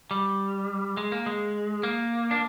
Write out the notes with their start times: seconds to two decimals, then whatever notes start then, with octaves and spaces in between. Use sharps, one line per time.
0.11 G3
0.97 G#3
1.12 A#3
1.26 G#3
1.83 A#3
2.31 D4